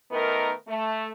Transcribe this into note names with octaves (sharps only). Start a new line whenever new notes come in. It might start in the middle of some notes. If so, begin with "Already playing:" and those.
D#3 A3 B3 D#4 A#4
A3